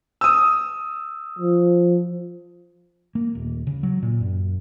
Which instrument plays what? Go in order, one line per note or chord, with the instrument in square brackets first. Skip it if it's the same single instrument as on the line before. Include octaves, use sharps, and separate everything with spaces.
[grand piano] D#6 E6
[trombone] F3
[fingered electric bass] A#3
D#1
C#3
F#3
A#2
F#2